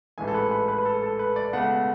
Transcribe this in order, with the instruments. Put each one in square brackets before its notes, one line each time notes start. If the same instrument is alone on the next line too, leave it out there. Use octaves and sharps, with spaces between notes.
[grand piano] A1 G#2 E3 A3 G#5
A4
B4
B4
B4
B4
A4
A4
B4
D5
C#2 B2 A3 F#5